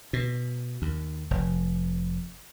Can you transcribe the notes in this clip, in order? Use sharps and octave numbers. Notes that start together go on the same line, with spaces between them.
B2
D#2
F1